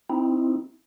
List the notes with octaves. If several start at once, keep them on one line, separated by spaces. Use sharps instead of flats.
C4 D#4 E4